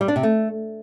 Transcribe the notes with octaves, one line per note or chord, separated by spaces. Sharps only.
G3
D4
C3
A3